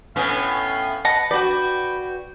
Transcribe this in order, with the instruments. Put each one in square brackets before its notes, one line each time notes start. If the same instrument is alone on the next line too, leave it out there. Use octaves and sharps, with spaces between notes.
[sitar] A2 B3 C#4 [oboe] F5
[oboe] B4 [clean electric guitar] D#5 F#5 A5
[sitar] F#4 D5 [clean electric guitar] B4 [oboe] G5